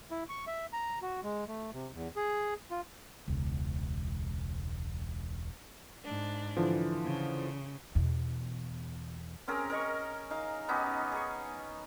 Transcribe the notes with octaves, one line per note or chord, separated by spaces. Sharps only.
E4
C#6
E5
A#5
F#4
G#3
A3
C3
E2
G#4
F4
E1 C#2
G#2 D4
D3 E3 F3
C#3
E2 B2
C4 C#4 G#4 A#4
A#4 D#5 C#6
D#4 F5
B3 C#4 D#4 G4
G#4 C#6